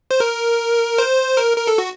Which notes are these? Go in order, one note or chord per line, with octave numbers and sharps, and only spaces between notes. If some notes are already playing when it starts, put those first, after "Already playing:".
C5
A#4
C5
A#4
A#4
A4
F#4